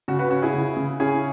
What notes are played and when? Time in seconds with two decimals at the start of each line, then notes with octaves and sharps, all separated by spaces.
0.08 C#3 F#4
0.19 F#4 B4
0.31 C#4 F#4
0.42 E4 G#4
0.54 C#3
0.77 C#3
1.00 C#4 E4 G#4